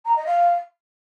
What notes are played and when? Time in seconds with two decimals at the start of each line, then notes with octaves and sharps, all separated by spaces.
0.05 A#5
0.16 D#5
0.26 F5